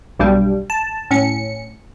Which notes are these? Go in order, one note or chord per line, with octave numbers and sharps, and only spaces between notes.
B1 G2 B2 G3
A5
A2 C#4 C#7